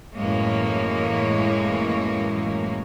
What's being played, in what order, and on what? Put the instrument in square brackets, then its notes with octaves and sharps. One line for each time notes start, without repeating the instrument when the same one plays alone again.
[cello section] F#2 A2 E3 G#3 A#3 C#5